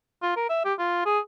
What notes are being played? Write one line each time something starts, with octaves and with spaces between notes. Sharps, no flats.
F4
A#4
E5
G4
F4
G#4